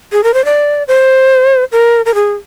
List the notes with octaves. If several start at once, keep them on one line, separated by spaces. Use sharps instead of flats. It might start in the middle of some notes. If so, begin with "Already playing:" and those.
G#4
A#4
C5
D5
C5
A#4
A#4
G#4